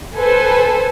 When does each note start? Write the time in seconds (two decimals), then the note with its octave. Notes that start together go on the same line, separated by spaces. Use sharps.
0.16 A4 B4 C5 G#5